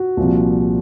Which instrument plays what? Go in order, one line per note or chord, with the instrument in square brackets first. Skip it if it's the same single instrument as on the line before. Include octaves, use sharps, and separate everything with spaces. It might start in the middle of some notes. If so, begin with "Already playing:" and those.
Already playing: [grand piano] F#4
C2 A#2 F3